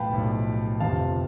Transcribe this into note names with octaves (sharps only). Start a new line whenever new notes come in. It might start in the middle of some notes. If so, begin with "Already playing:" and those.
Already playing: B1 A2 F3 B4 F5 G5 A5 B5
B1 A2 F3
G1 F2 C3 F3 F5 A5